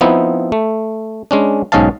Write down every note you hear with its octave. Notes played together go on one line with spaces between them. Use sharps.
F3 B3 C4 D#4 E4
A3
G#3 C#4 D4
B1 G#2 C#4 D#5 F5 A5